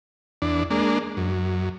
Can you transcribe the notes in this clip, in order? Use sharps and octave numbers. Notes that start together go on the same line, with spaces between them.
E2 D4
G#3 A#3 D4
F#2